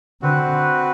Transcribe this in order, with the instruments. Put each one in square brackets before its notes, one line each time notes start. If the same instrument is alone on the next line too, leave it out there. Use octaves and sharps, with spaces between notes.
[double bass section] D3 [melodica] C4 F#4 B4